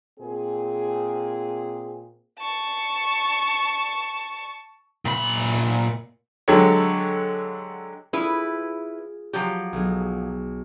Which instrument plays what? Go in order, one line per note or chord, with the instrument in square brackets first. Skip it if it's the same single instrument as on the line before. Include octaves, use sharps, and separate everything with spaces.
[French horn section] A#2 C4 G#4
[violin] A5 C#6
[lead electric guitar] A#2 B5
[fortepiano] D3 F#3 G#3 G4 A4 C#5
[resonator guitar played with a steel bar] E4 B4 [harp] F4 G#4
[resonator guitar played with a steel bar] F3 F#3 G4
[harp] B1 G#4